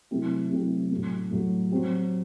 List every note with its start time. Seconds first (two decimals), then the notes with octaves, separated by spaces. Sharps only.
0.11 C3 F#3 A3 E4 G4
0.50 C3 F#3 A3 E4 G4
0.91 A2 F#3 A3
1.31 A2 F#3 A3
1.71 F#3 C4 G4